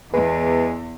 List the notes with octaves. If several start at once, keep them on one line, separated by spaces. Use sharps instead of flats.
E2 G#3 B4